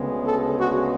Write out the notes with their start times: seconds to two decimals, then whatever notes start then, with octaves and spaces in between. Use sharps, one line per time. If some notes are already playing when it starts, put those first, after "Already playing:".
Already playing: D2 C#3 G#3 B3
0.26 A4
0.59 F#4